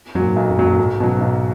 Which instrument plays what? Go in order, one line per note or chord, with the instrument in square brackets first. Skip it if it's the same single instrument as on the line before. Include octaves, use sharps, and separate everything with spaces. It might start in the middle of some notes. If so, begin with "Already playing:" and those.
[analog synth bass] F#2 [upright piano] A#2 F#3
[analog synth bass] G#2
[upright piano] B1
[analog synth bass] F#2
[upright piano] A#2 F#3
[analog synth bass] F#2
[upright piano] B1 [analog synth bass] G#2
[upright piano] B2 F#3
B1